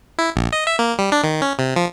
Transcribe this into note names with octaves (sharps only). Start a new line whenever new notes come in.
E4
A#1
D#5
E5
A#3
G3
D4
D#3
C#4
C3
F3